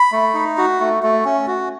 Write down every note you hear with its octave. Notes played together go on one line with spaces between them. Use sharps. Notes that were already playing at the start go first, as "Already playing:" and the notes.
Already playing: B5
A3
D#4
F#4
A3
A3
C#4
F#4